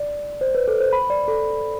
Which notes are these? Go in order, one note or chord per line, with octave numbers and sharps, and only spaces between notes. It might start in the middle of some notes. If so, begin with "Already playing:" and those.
Already playing: D5
C5
B4
A4
C5
B5
D5
A4